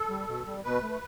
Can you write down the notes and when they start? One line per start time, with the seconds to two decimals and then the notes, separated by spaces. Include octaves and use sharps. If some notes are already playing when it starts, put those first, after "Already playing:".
Already playing: A4
0.10 G3
0.28 B2
0.46 G3
0.64 B2 B4
0.83 A3